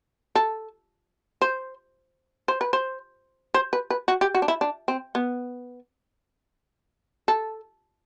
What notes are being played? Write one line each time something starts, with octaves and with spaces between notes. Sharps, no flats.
A4
C5
C5
B4
C5
C5
B4
B4
F#4
G4
F#4
D4
E4
D4
C4
B3
A4